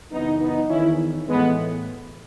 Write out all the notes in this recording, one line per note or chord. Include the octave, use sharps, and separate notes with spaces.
F#2 C#3 E3 B3 D#4
B3 D#4
E2 D#3 C#4 E4
A2 E3 G#3 B3